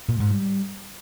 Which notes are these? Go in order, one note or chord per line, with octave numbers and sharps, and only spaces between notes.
A#2
G#2
G3